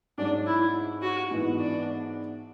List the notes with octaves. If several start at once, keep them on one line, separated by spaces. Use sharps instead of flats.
G#2 F#3 C#4 D4
E4
F#4
G#2 E3 B3 E4
D4